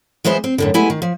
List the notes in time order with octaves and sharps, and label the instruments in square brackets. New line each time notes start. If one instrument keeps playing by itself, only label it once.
[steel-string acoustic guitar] E3 G#3 B3 C5 D#5 E5
C4
F#2 A2 D3
G#3 A3 B3 E4 G4 G#5
D#3
F3